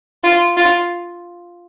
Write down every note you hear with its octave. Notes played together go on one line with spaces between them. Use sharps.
F4
F4